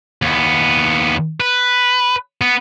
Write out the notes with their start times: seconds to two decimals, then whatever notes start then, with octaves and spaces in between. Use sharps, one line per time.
0.22 D#2 B3
1.40 B4
2.41 B3